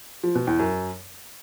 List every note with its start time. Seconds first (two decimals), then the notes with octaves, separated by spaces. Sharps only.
0.23 F3
0.35 B2
0.47 E2
0.59 F#2